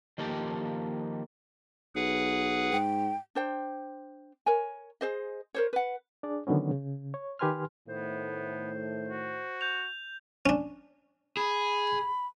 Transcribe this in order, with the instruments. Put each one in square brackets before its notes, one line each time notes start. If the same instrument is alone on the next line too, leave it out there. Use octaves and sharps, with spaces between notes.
[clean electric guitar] D#3 F3 A#3 G4 A4
[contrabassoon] B1 [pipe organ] G#4 B4 F#5
[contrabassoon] G#2 [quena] G5
[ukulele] D4 C5 G5
A#4 C#5 G#5
G#4 C5 D#5
A#4 C5 C#5
B4 F#5
[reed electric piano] D4 G#4 D5
D3 D#3 F#3 B3 C#4
C#3
C#5
D#3 G4 B4 G#5 C6 F6
[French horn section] A2 D#3 A3 [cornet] B3 [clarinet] C5
[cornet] F#4
[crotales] G6 F7
[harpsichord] C#4 D4
[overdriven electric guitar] G#4 [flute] B5